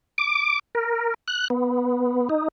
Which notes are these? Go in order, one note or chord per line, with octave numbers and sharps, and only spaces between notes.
D6
A#4
F#6
B3
D#4